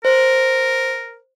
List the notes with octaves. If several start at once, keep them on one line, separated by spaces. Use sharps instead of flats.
A#4 C5